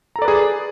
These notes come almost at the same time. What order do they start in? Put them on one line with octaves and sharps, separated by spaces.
A#5 A4 D5 B4 G#4